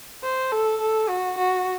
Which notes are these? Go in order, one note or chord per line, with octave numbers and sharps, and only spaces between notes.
C5
A4
A4
F#4
F#4